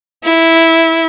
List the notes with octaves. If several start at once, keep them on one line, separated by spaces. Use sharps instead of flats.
E4